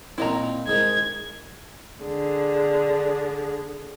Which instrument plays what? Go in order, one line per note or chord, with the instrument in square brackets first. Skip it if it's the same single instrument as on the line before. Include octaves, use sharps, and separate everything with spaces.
[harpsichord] A#2 C4 [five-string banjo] E4 D#5 A#5
[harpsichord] G#2 D#3 [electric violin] G#6
[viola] D3 G#4